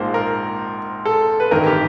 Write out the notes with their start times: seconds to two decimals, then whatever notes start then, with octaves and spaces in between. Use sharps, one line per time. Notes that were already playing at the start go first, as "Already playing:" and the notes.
Already playing: A#1 G#2 F3 A#3 C5
0.14 A#4
1.05 A4
1.40 B4
1.51 A1 G2 D#3 A#4
1.67 G4